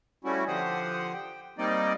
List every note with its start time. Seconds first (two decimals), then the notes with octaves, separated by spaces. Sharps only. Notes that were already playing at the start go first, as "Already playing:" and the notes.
0.24 G3 A3 C#4 E4 F#4
0.48 D3 F3 G4 C5 F#5 D#6
1.13 G5
1.58 G3 A#3 C4 D#4 D5 D#5